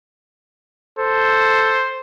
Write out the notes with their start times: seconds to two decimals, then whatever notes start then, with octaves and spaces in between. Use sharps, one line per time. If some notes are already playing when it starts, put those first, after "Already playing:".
0.99 A4 C5